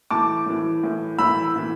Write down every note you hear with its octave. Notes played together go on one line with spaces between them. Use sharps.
A2 E3 A5 D6
A2 E3
A2 E3
A2 E3 B5 E6
A2 E3